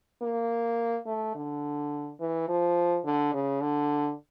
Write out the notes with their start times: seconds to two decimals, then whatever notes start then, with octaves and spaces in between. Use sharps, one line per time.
0.22 A#3
1.06 A3
1.35 D3
2.20 E3
2.48 F3
3.05 D3
3.33 C#3
3.62 D3